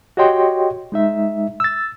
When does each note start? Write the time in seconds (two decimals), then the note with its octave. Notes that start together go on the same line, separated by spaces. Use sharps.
0.17 F#4 G4 C#5 D#5 G5 C6
0.92 G#3 D#4 E5
1.60 E6 A6